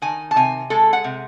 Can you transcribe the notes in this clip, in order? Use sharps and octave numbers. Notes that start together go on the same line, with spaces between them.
D#3 G#5
A5
C3 G#5
G#3 A4
F#5
C3